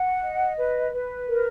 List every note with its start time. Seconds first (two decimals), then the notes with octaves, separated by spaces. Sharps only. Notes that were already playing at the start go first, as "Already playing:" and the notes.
Already playing: F#5
0.21 D#5
0.56 B4
0.92 B4
1.28 A#4